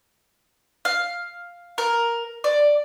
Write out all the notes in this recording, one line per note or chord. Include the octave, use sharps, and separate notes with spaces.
F5
A#4
D5